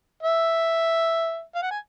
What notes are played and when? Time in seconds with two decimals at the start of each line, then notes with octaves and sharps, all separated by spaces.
0.23 E5
1.55 F5
1.63 F#5
1.71 G#5